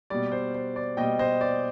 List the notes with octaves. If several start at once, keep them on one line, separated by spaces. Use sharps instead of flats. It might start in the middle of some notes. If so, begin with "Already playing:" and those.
B2 G3 D5
C5
C5
D5
B2 G3 D#5 G5
C5 D#5
D5